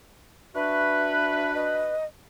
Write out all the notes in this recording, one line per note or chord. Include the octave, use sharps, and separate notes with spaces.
D4 F#4 B4 E5
D#5